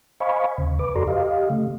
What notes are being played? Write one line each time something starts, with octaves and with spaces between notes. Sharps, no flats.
C5 D#5 F5 G#5 B5 C#6
D#2 C#3
B4 D6
F2 F#4 A4 D5 A#5 C6
G4 D#5 F5
C#3 A3